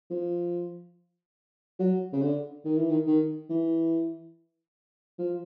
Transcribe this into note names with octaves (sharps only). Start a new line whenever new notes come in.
F3
F#3
C#3
D3
D#3
E3
D#3
D#3
E3
F3